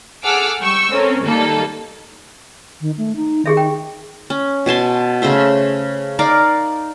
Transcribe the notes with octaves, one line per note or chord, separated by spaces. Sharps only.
G#4 A4 F#5 D6 E6 F6
G3 G5 C#6 E6
C4 C#4 A4 A#4
D#3 G3 A#3 D#4 A4
D#3
A3
D#4
D#3 G4 G#4 E5
G5
C#4
B2 G#5 A5 C6
C#3 A3 C5 E5
D#4 A#4 D5 F5